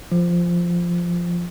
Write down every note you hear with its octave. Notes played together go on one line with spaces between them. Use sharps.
F3